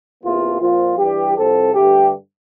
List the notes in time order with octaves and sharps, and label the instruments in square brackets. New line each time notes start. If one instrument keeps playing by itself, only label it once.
[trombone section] E2 C3 E3 A#3 F4
A#2 F3 C4 F4
G2 E3 G3 G4
C2 C3 F3 C4 A4
G2 D3 A3 G4